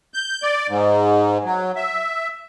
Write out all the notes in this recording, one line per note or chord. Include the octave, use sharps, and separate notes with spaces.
G6
D5
G#2
F#3
E5